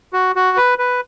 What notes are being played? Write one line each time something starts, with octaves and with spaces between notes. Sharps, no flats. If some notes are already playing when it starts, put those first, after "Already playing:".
F#4
F#4
B4
B4